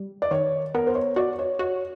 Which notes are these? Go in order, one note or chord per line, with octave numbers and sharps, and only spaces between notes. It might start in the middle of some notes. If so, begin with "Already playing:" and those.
Already playing: G3
D5
D#3 C#5
B3 A#4
C5
C#5
F#4 D5
C#5
F#4 C#5